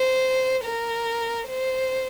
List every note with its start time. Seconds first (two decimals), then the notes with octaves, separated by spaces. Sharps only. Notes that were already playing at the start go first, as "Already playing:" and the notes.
Already playing: C5
0.64 A#4
1.48 C5